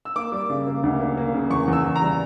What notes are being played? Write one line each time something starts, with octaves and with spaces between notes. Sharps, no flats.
E6
A#3 D6
G3
C#3
A#3
D2
A#3
A#3
C#3
E2 C#6
E2 E6
E2
A#5
G3